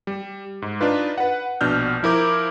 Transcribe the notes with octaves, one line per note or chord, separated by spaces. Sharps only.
G3
G#2
D4 D#4 F4 B4
B4 F#5
A#1 B2 D4 F6 G6
F3 E4 A#4 D6 G6